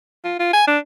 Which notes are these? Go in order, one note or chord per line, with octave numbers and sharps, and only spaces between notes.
F4
F4
G#5
D4